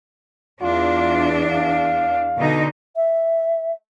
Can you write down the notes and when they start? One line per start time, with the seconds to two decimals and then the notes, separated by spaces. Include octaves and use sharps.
0.62 E2 D4 F4
1.51 F5
2.36 B2 D3 D#4
2.96 E5